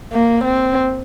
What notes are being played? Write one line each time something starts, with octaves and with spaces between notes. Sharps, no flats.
A#3
C4